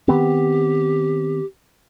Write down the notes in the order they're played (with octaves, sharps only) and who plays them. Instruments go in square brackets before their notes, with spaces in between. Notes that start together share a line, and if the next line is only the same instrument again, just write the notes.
[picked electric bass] D#3 B3 C4 [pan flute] G4